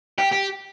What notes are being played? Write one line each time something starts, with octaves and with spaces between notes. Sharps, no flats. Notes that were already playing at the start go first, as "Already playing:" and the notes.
G4
G4